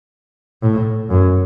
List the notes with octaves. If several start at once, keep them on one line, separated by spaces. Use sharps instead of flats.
A2
F#2